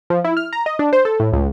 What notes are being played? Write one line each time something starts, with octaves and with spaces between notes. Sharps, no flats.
F3
E4
F6
A#5
D#5
D4
C5
A4
A2
C#2